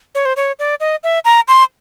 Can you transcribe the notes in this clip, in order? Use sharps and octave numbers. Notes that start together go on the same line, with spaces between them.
C#5
C5
C#5
D5
D#5
E5
A#5
C6